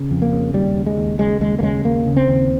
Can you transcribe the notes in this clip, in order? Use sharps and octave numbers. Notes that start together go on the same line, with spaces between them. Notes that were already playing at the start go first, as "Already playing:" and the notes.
Already playing: C#3
F2
A#3
C#3
D#2 G3
C#3
G#3
D#2
C#3 G#3
D#2 G#3
A#3
C#3 G#3
D#2 A#3
C#3
C4
D#2